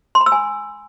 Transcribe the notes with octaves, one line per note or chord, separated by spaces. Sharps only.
C6
B5
E6
G#5